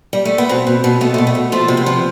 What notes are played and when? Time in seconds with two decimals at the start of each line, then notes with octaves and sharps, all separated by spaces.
0.13 G3
0.25 A3
0.38 B3
0.49 B2 C4
0.67 B2
0.84 B2
1.01 B2 A3
1.14 A3
1.18 B2
1.27 A3
1.35 B2
1.52 F3 A3
1.68 C3
1.77 B3
1.86 F3